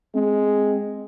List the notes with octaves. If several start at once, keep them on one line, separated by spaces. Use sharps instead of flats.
G#3 C4